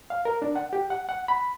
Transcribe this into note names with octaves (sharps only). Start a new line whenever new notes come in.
F5
A#4
D4
F#5
G4
F#5
F#5
B5